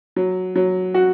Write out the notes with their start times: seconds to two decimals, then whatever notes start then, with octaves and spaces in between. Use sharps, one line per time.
0.16 F#3
0.55 F#3
0.94 F#4